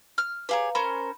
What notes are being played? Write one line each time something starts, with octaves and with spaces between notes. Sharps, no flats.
F6
G4 G#4 B4 C#5 F5 A#5
C#4 A#4 C5 B5